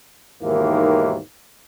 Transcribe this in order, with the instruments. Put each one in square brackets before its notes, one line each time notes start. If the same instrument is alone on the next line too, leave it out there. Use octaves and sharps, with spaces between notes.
[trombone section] D#2 G#2 B2 D#3 E3 A#3